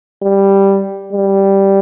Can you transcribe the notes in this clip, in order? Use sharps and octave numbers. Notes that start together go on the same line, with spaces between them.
G3
G3